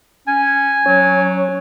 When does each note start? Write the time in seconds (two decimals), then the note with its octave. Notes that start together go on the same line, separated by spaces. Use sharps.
0.27 C#4 G#5
0.86 F#3 C#4 C#5